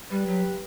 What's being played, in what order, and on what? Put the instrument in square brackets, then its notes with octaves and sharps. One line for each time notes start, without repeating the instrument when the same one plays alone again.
[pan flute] G3 [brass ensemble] G4 B4
[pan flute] F#3